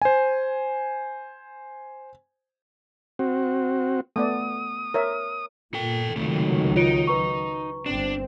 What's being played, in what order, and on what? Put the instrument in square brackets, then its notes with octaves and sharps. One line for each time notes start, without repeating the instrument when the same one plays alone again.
[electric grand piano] C5 G#5
[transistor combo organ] C4 F#4
[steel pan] A3 B3 D5 [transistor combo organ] D#6
[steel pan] A#4 C#5 E5
[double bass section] A#2 [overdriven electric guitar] A4 G5
[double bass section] C#2 D#3 F#3 [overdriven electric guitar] C3 A3
[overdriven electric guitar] D#4 [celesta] F4 C#5 D7
[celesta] B4 A#5 C#6
[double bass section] G1 C4 [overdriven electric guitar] D4 [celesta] E7